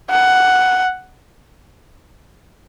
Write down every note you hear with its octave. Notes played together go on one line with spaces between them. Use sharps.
F#5